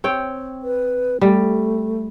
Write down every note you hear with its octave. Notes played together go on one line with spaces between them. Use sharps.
C4 C#5 G5
B4
G3 A3